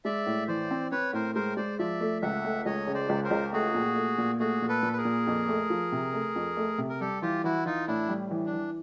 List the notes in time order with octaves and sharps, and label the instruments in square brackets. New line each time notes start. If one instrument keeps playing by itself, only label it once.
[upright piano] G#3 [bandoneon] D5 E5
[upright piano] A2
[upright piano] E3 [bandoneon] C5 D5
[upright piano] C4
[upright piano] C4 [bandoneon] B4 C#5
[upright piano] A2 [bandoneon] A#4 C5
[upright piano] G#3 [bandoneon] A#4 C5
[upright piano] G#3 [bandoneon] C5 D5
[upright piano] F3 [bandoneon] D5 E5
[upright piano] A3
[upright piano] C#2 [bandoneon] E5 F#5
[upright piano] A3
[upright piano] C#2 [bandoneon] C#5 D#5
[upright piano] C#3
[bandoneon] C5 D5
[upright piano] C#2
[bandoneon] A#4 C5
[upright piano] C#2
[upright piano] A3 [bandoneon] F#4 G#4
[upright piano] A#2
A3
A#2
[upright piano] A3 [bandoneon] F#4 G#4
[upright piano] A#2
[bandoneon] A4 B4
[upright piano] A#2
[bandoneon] B4
G#4 A#4
[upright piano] A#2
F2
A3
F3
C3
A3
F2
A3
C3
[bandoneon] A#4
[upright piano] G3 [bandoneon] G4 A4
[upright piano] E3 [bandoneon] F4 G4
[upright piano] E3 [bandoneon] E4 F#4
[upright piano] E3 [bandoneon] D#4 F4
[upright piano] A2 [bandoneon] D4 E4
[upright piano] G3
E3
[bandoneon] D4
[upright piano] E3